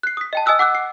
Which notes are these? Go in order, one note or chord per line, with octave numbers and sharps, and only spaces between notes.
F#6 C7
D#6 B6
D#5 G5 A5
D#5 G#5 D#6 E6 F#6
F#5 D6 E6 F#6
C7